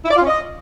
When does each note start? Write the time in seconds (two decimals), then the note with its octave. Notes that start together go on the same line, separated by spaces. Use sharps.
0.05 E4
0.11 D5
0.16 F4
0.22 C#4
0.27 D#5